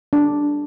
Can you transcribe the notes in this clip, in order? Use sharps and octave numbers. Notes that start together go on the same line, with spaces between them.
D4